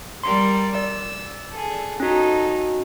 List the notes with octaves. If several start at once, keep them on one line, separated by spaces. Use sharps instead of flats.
G3 A#4 D5 C6
D5 E6
G#4 A4
C#4 D#4 F#4 A4